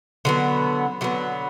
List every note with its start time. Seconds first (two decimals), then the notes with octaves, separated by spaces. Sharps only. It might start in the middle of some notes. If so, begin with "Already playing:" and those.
0.25 D3 F#3 B3
1.01 D3 F#3 B3